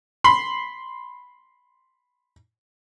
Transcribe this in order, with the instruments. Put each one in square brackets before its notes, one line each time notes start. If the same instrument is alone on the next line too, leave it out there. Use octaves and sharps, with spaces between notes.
[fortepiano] B5 C6